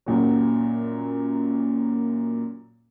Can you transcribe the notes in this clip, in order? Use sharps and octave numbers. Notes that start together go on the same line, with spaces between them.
F#2 A#2 F#3